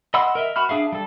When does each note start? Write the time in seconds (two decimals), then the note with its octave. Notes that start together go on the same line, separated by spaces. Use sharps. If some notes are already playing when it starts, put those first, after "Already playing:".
0.14 D#5 F#5 B5 C6 E6
0.35 A#4 D#5 E5
0.56 F#4 B5 F6
0.69 D4 G#4 E5 F5
0.92 G3 A4